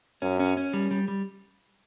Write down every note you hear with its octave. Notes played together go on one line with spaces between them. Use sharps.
F#2 C#4
C#4
C#4
G3
G3
G3